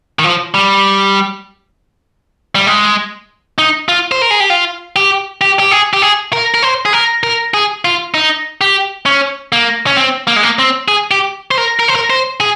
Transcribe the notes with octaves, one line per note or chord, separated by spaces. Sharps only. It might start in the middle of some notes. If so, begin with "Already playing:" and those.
D#3
F3
G3
G3
G#3
D#4
F4
C5
A#4
G#4
G4
F4
G4
G4
G4
G#4
G4
G#4
A#4
A#4
C5
G#4
A#4
A#4
G#4
F4
D#4
G4
C#4
A#3
C#4
C4
A#3
G#3
A#3
C4
G#4
G4
C5
A#4
A#4
C5
A#4
C5
G#4